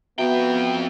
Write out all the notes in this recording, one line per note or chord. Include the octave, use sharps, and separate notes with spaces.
F2 B3 F#4 E5 G5 A#5